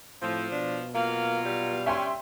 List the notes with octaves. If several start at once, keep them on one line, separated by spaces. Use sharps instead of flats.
A2 F3 C4
B2 D4
F#3 A#3 F4
G3
C#4 E5 G5 C6